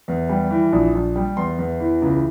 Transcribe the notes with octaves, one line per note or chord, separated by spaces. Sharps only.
E2
G3
E3
A#1
A#1
G3
E2 C6
E2
E3
C#2